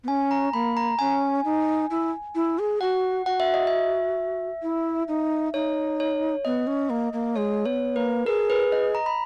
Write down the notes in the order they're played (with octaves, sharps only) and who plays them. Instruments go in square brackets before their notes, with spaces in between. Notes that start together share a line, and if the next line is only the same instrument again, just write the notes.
[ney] B3
[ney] C#4 [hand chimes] G#5
[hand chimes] A#5
[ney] A#3 [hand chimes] B5
[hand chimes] A#5
[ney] C#4 [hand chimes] G#5
[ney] D#4
E4
E4
G#4
[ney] F#4 [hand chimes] F#5
[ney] F#4 [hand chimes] F#5
[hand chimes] E5
D#5
E5
[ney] E4
D#4
[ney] D#4 [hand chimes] C#5
[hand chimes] C#5
[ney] B3 [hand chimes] D#5
[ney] C#4
A#3
A#3
[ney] G#3 [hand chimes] C#5
[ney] B3 [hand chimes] C#5
[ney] A#3 [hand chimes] B4
[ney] G#4 [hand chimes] A#4
[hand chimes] B4
D#5
A#5
B5